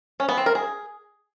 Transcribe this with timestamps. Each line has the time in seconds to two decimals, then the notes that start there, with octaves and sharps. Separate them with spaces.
0.20 C#4
0.29 B3
0.37 C4
0.46 A#4
0.55 G#4